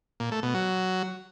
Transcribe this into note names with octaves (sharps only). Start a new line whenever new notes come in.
A#2
A3
B2
F#3